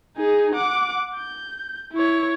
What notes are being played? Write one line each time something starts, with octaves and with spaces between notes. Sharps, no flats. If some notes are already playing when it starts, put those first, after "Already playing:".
D#4 G#4
F#5 D6
G6
E4 C#5